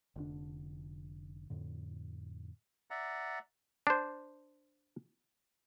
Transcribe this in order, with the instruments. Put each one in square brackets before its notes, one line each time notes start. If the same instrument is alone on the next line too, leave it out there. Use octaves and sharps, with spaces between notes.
[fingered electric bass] F1 D3 D4
F2 A2 D3
[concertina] D5 E5 F#5 A#5
[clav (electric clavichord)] D4 C5